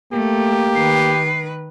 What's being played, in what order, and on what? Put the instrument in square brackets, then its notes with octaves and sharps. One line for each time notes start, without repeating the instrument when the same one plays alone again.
[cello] A3 [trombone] A#3 [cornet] G4
[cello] D#3 B4 [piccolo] C7